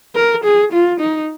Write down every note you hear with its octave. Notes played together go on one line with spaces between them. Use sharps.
A#4
G#4
F4
D#4